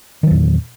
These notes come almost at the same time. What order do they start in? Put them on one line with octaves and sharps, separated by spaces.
D#3 F#3 E2 A#2